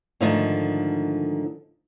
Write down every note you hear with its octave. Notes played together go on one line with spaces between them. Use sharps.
G#2 D3 D#3 F3 A3 D#4